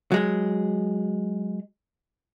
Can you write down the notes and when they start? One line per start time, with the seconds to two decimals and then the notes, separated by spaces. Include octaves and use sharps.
0.12 F#3 G#3 G#4